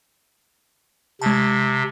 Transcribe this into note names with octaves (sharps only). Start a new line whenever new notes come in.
C3 G#3 A5